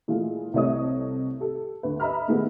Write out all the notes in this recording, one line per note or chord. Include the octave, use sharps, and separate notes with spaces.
A#2 E3 G#3 A3 F4 G#4
C2 A3 C4 C#5 D#5 D#6
G4 A4
D2 B4
D#5 E5 A#5 B5 F6
A#2 D#3 G#3 A3 B3